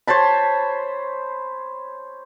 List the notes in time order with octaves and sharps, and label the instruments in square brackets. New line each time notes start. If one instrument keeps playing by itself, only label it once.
[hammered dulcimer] C5 C#5 A5 B5